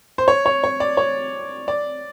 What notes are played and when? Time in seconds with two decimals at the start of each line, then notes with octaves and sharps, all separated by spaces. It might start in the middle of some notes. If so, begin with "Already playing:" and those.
0.18 C5
0.28 C#5
0.46 C#5
0.64 C#5
0.80 D5
0.97 C#5
1.68 D5